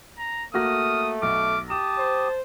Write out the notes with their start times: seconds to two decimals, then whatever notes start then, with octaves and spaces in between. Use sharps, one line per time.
0.18 A#5
0.54 A3 A#3 F#4 D#6 F6 A#6
1.22 B1 D6 F6
1.70 G4 A5 D#6 E7
1.99 C5